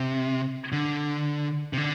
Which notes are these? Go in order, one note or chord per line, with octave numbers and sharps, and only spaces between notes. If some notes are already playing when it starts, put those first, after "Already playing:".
Already playing: C3
D3
C3
D3